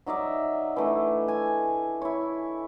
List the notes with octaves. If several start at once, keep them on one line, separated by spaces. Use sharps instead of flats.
F#3 D#4 D5 E5
E3 A3 D4
G#5
E4 C#5